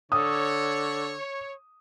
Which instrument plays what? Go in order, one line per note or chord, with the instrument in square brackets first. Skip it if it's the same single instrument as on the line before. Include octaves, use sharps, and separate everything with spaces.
[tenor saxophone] D3 [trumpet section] C#5 [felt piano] D#6